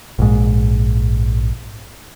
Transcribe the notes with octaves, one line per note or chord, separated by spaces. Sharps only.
A#1 G#2